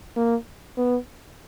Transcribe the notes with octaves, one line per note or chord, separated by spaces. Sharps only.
A#3
B3